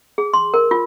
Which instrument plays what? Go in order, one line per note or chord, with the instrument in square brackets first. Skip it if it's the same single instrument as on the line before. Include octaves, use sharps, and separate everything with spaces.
[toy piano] G#4
C6
A#4
F4